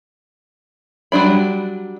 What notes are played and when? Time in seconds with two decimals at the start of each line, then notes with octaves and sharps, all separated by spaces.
1.12 F#3 G3 D4 B5